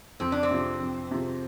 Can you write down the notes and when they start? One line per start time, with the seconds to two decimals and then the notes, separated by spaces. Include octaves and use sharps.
0.20 F2 C4
0.32 D4
0.43 C4
0.51 C3 F3
0.80 F2
1.11 C3 F3